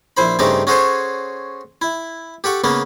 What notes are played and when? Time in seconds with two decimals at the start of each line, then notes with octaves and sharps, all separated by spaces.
0.17 A#1 E4 C5 B5
0.39 G2 C#3 A3 C4 D#4 D6
0.67 C#4 F#4 G#4 A4 C5 C#5
1.82 E4
2.44 G4 A4 F#5 C#6
2.64 C#3 A#3 B3 C#4